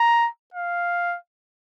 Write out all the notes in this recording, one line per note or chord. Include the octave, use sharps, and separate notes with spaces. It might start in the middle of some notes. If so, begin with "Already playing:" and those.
Already playing: A#5
F5